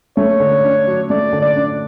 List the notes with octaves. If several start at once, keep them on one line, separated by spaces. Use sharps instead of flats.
A3 C#5
D3
D4
F#3
A3 D5
D3
D5
D4